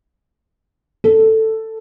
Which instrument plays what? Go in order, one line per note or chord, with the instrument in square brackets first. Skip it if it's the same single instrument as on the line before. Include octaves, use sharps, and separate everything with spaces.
[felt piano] A4